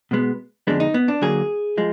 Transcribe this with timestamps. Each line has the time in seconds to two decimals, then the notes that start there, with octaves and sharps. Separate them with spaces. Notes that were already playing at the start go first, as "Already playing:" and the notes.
0.11 B2 G#3 B3
0.67 F2 D3 G#3 B3 D4
0.80 D#4
0.94 B3
1.08 D4
1.21 D3 F#3 A#3 G#4
1.77 F3 G#3